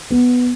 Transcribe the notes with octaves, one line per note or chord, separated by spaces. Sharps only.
B3